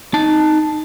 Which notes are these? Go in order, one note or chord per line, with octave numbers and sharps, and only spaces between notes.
D#4 A5